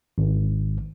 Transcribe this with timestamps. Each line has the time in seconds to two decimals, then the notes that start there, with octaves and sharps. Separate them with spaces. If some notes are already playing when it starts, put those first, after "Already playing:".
0.18 G#1